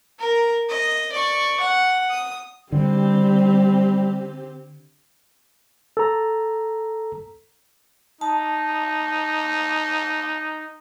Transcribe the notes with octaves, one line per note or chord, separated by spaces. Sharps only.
A#4
D#5
D5 C#6
F#5
D#6
D3 G3 C4 G4
A4 A#5
D#4 A5